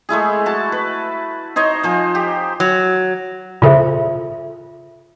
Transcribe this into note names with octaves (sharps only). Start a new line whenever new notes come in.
G#3 A3 E4 G#4
F#4 A5
B4
D#4 C5 C#5 D#5
F3 C5 G#5
G4
F#3
A#2 C#3 F4 A4 C5 E5